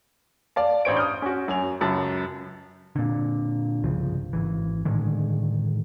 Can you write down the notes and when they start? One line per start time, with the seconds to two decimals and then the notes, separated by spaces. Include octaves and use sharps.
0.56 D5 F5 A5
0.85 A1 D4 C5 C#5 D7
0.97 D#6 F6 G6
1.22 C#4 F#4
1.48 F#2 G#5 F7
1.81 C#2 F#2 A5 A6
2.96 A#2 D3
3.83 G1 C2 C#3 F3
4.33 G#1 E3
4.85 A2 D3 D#3 G#3